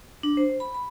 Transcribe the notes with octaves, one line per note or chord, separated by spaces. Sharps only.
D4
C5
B5
B5